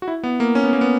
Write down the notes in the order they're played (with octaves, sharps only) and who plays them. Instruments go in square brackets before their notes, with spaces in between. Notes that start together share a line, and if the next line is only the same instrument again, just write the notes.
[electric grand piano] F#4
E4
B3
A#3
C#4
B3
A#3
B3